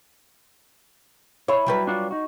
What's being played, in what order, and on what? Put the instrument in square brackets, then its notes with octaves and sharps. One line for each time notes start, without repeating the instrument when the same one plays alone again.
[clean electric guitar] E4 [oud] C#5
[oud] F#3 G3 B4
[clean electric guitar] D4 F4 F#4
D#4 F#4